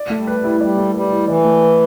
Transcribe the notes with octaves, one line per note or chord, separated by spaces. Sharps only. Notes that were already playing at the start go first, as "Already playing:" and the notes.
Already playing: D5
A3
G3
B4
G3
E4
G3 D5
A3
G3 B4
E4
E3 D5
A3
B4